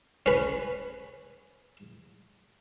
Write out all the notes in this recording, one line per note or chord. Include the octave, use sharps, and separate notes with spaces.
C#4 B4